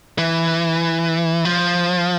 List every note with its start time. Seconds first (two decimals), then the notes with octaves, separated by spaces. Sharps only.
0.18 E3
1.45 F3